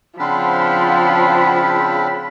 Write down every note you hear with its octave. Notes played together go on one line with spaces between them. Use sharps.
C#3 F3 C4 D4 F4 F#5 B5 C6